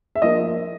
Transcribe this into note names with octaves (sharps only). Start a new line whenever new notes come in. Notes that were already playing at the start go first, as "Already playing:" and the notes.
E5
F3 A#3 D4 D#5